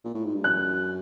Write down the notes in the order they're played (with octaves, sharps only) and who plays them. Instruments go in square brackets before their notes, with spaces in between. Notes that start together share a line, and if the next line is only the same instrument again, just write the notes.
[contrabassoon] A#2
A2
G#2
G2
[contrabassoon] F#2 [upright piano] F#6